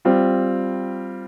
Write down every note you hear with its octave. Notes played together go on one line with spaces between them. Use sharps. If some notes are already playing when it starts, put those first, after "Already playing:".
G3 C4 F4